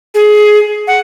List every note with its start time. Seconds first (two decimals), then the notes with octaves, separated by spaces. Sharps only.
0.14 G#4
0.87 F#5